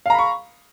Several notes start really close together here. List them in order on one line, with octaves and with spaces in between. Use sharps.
F5 A#5 B5 C#6